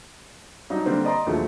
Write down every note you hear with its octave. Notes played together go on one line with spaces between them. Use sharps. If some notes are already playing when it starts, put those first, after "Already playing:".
F#3 G3 D4 D#4
D3 G3 A#3 C4
D5 D#5 A#5 C6
D#2 A#2 F3 F#3 G#3 A3